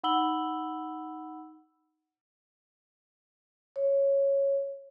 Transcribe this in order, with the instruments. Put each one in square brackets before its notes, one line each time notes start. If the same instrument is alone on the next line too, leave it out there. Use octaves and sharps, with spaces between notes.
[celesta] D#4 F#5 B5 E6 F#7 G7
[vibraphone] C#5